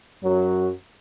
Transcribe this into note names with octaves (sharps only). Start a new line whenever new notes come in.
F#2 F#3